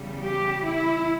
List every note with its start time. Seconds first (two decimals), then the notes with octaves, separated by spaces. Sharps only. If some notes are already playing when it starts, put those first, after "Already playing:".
Already playing: E2 C#3 G3
0.21 G4
0.63 E4